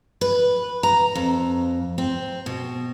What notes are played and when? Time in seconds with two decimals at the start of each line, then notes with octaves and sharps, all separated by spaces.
0.21 B4
0.83 A#5
1.15 F2
1.98 C4
2.46 B2